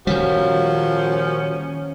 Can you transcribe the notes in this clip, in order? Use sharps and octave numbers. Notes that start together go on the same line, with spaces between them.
A#2 D#3 F3 G3 C#4 F#4